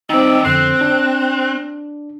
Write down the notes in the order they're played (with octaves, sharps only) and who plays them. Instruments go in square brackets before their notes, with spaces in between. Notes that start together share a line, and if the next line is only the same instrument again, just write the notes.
[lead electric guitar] D#3 D5 [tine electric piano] C4 D#4 [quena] E6
[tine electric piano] F2 D3 C7 [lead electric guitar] C4 [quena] F#6
[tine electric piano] D4